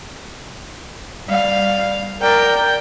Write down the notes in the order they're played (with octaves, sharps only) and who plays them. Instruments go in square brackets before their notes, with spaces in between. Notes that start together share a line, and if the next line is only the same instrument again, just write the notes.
[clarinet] G3 [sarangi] F5
[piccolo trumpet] A#4 [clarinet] D5 [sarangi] G5